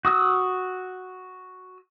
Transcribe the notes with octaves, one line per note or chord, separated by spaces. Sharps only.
F#4 D#6 E6